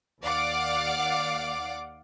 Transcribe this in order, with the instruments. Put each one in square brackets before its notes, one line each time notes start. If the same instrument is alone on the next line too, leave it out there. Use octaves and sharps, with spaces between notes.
[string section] D#2 D5 F5 F#5 D6